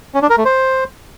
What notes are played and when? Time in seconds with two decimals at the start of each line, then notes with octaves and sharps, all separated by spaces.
0.14 C#4
0.22 D4
0.30 A#4
0.37 A3
0.45 C5